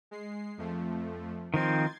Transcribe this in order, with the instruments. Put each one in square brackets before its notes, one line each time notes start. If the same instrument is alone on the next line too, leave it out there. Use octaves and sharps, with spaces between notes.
[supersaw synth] G#3 C7
F2 F3 A3
[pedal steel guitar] D#3 F3 C4 [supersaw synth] C6 G#6 A6